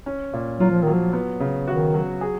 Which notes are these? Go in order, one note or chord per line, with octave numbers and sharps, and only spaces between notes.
C#4
A#2
F#3 F4
F3
D#3 F#3
F3
B3
C#3
D#3 F#4
F#3
G#4